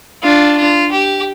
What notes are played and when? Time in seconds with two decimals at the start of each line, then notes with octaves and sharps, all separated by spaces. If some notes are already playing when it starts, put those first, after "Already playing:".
0.23 D4 F4
0.58 F4
0.92 G4